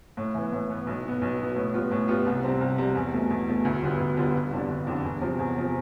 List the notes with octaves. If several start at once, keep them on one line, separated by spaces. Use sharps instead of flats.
A2
E3 B3
A2
E3 B3
B1
B2 B3
B1
B2 B3
A2
G3 B3 F4
A2
G3 B3 F4
C2
C3 G3 C4
C2
C3 G3 C4
E2
B2 A3
E2
B2 A3
D2
D3 G3 B3 F4
D2
D3 G3 B3 F4
G1
F2 D3 G3 D4
G1
F2 D3 G3 D4
E2
C3 F3
E2
C3 F3